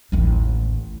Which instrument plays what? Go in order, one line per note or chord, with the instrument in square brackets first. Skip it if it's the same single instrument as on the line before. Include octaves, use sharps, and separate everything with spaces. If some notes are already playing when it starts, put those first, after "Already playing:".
[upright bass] A1 D#2